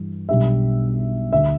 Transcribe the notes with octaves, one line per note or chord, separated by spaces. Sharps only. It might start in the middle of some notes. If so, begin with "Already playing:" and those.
Already playing: G2 E3 G3
B1 B2 G3 D4 E5
D2 D3 A3 E5